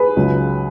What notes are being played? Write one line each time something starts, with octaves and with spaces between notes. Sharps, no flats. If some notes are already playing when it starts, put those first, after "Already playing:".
Already playing: G#4 B4
C#2 C#3 F#3